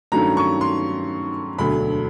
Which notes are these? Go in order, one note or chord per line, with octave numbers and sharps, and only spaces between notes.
G2 D#3 F#3 A3 C#4 A#5
C#6
C6
E1 D2 D3 F#3 A3 B5